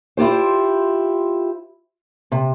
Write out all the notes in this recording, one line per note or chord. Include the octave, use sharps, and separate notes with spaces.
E4 F4 G4 C5
C3